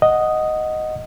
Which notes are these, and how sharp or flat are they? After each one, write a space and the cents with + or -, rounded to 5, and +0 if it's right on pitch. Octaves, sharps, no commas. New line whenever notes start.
D#5 +0 F#5 +0